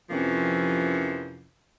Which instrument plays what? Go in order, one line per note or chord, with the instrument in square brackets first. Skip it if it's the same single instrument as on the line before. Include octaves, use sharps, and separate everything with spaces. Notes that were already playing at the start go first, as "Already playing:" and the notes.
[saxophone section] F2 C3 E3 F3 A#3 C#4